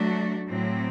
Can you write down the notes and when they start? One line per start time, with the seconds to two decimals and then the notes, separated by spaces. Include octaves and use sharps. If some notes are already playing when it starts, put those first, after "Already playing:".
Already playing: F#3 A3 D4 F#4
0.49 A2 F#3 C4